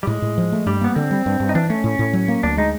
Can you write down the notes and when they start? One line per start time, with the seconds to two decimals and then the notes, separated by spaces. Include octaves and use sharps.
0.03 G3
0.07 A2 G#3
0.22 A2
0.38 F3
0.52 A3
0.66 G2 G3
0.81 A#3 B3
0.95 D3 C4
1.11 G3
1.26 G2
1.40 G2
1.49 D#4
1.55 E3 D4
1.70 A3 C#4
1.84 A2
1.99 A2
2.13 F#3
2.28 A#3
2.43 D2 D4
2.57 G#3 D#4